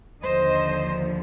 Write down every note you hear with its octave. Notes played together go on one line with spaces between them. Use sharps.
D#2 D3 F3 C5 D#5